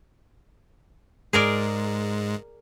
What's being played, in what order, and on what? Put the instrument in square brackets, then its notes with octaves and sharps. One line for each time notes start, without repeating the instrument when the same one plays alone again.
[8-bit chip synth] G#2 G#3 [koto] G#4 A#4 D5